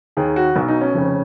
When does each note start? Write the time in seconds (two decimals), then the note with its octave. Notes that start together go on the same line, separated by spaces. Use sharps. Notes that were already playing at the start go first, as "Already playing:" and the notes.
0.17 D#2 D#3 G#4
0.36 F#4
0.56 B1 B2
0.68 D#4
0.81 C#4
0.94 F1 F2 C#3